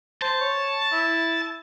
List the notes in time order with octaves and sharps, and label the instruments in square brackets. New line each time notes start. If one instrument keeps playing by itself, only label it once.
[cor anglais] C5 [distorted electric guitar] A5
[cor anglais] C#5
E4